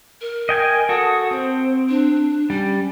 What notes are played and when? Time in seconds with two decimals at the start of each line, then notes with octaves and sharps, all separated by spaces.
0.21 A#4
0.49 D#5 G5 G#5
0.89 F#4 A4 D#6
1.31 C4 C5
1.89 D4
2.50 G3 C#4